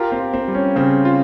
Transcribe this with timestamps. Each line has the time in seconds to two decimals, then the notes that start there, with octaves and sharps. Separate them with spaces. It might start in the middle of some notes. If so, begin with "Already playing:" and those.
Already playing: F4 G4 A#4
0.12 C4
0.20 F4
0.34 C4
0.48 G3
0.55 C#4
0.76 C#3 C4
1.05 F4